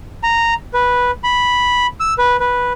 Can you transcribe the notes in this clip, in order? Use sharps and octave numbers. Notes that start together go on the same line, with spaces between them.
A#5
B4
B5
E6
B4
B4